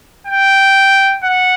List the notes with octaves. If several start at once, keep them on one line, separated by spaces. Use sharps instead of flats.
G5
F#5